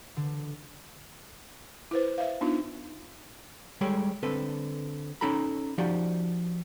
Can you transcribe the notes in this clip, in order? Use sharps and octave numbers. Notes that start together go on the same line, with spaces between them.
D3
E4 B4 C5
E5 F5
B3 D4 D#4 F4
G3 G#3 G4 A4 C#5
D3 C4 A4 B4
C#4 D#4 A4 A#5 B5
F3 D#4 F#4 G4 D5